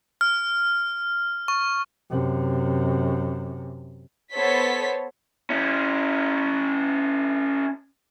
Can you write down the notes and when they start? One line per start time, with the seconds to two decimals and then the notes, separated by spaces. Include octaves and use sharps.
0.21 F6
1.48 C#6
2.10 F#2 C3
4.33 B3 A4 C5 C#5 B6
5.50 C#4 E4